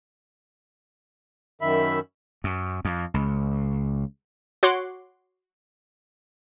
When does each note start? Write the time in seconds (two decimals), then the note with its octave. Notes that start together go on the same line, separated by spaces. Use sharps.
1.61 F#2 D#3 E5 B5
2.44 F#2
2.85 F2
3.14 C#2
4.63 F#4 C#5 F#5 C6 D6 F#6